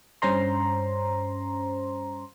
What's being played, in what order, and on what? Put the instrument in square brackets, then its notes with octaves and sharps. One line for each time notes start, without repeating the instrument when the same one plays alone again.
[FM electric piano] G2 C#4 C5 A#5 C6